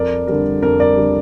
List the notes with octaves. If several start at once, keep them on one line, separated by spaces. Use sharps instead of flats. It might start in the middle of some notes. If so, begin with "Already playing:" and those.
Already playing: F2 A#4 D5
D3 G3 A#4
F2 A#4
A#4 D5
D3 G3